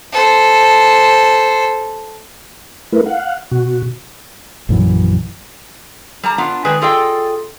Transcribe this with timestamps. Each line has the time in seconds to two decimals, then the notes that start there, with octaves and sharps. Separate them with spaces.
0.12 A4 C5
2.92 A3 E4 A#4 B4
3.06 F5 F#5
3.51 B2 F#4
4.69 A#1 F#2 E3 F#3
6.23 G3 A5 A#5
6.38 B3 D4 F4
6.65 D#3 G#3 G#4 B4 D5
6.82 F4 G#4 A4 D5 D#5 G5